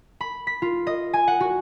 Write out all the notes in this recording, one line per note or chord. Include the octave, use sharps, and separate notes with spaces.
B5
B6
F4
D#5
G#5
F#5
F#4